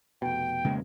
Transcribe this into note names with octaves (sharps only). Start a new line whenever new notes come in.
F1 B2 G5
C#3 G#3 A#3